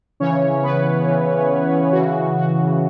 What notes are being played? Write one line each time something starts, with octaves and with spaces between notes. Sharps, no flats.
C#3 E3 C#4 C#5
B3 B4
C#3 E3
C#3 E3 F#4
F#4